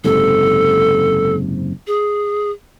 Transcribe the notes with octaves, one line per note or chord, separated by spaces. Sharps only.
F#1 G#2 C3 A4
G#4